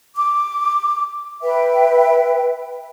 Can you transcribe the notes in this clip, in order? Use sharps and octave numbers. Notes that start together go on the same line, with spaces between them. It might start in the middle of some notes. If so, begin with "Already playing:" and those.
D6
B4 E5 G5